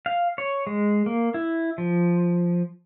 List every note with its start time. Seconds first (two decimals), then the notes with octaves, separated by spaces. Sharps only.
0.06 F5
0.38 C#5
0.67 G#3
1.06 A#3
1.34 E4
1.78 F3